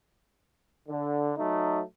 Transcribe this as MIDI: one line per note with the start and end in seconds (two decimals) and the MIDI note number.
0.88 1.32 50
1.38 1.81 54
1.38 1.81 57
1.38 1.81 63